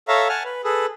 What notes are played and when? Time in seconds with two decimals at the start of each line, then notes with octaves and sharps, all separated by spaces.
0.08 A4 C#5 E5 F5 A#5
0.29 F#5 G#5 A5 F6
0.45 B4
0.64 G#4 A4 B4